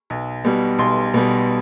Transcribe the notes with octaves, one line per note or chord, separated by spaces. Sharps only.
B1
B2 G3
B1 C6
B2 G3